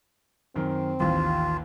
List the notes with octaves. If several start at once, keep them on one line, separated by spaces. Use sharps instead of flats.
F#2 D#3 C4
A1 D#2 F4